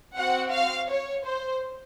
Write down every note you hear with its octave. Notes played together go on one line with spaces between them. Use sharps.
C4 F#4 F#5
F5
C#5
C5